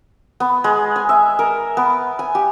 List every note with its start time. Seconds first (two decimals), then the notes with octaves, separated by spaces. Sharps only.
0.40 B3
0.64 G#3
0.96 G#5
1.09 E5
1.39 A#4
1.77 B3
2.19 G#5
2.35 G4